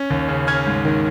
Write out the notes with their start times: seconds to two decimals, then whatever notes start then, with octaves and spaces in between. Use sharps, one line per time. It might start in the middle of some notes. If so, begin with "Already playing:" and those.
Already playing: C#4
0.10 D#2
0.28 C#3
0.47 C#4 F6 G#6
0.67 G#2
0.85 D#3